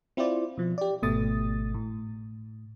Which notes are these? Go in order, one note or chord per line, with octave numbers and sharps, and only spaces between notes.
C4 E4 F4 C5 D5
B2 F3
G4 D5
G#1 B2 A3 D#6 A6
A2